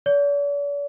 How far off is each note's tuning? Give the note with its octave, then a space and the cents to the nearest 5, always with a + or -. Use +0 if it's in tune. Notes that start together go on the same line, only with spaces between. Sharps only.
D5 -45